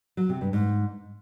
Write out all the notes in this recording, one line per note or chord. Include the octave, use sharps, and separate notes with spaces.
F#3
C3
G2
G#2